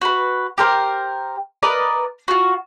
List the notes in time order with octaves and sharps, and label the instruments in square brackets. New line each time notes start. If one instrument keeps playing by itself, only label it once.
[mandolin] F#4 B4
G4 A#4 C5
A#4 B4 D5 D#5
F4 F#4